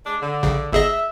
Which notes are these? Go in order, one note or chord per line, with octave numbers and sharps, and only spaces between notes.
G#3 D4
D3
A#1 C#3
G1 G#4 D#5 E5